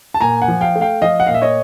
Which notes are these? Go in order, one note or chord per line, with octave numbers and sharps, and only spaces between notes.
A5
A#2 G#5 A#5
F#5 G#5
F3
F5 G5
A3
F5 G5
F3 D#5 F5
F#5
A#2 F5
E5
C#5 D#5